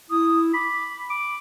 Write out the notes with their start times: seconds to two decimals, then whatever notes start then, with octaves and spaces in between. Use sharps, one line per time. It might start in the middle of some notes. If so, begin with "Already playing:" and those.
0.10 E4 D#6
0.54 B5 D6
1.10 B5 D6